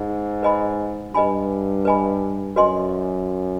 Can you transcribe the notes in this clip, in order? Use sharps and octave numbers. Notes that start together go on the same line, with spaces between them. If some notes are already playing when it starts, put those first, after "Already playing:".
Already playing: G#2
B4 D#5 G#5 B5
G2 B4 D#5 G#5 B5
B4 D#5 G#5 B5
F#2 F#4 B4 D#5 G#5 C6